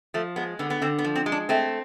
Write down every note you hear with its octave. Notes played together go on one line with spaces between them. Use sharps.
F3 A3
G#3 B3
D3 B3
B3
D3 C4
B3
F3
C4
G#3
D4
A3 C4